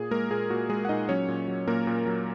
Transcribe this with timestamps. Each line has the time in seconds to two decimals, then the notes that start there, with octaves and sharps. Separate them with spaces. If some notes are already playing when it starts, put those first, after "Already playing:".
Already playing: A#2 G#4
0.11 G#3 A#3 A#4
0.30 A#2 G#4
0.50 A#2 F#4
0.70 G#3 G#4
0.85 F#5
0.89 A#2 D#4 D#5
1.09 F#3 C#4 C#5
1.28 A#2
1.48 F#3
1.68 A#2 A#3 A#4
1.87 A#2
2.07 F#3